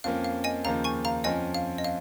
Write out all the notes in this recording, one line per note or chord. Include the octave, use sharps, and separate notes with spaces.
F2 F3 A#3 C#4 F5
F5
D#5 G#5
D#2 C#3 F3 A#3 F5 A#5
G#5 C#6
F5 A#5
F2 F3 C#4 D#5 G#5
F5
D#5
F5